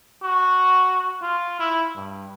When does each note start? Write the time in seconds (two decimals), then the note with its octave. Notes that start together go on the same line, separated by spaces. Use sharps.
0.23 F#4
1.22 F4
1.60 E4
1.95 G2